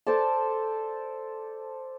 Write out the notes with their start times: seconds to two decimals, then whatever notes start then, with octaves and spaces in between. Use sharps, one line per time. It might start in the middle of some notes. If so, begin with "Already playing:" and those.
0.07 A4 C5 D5 A5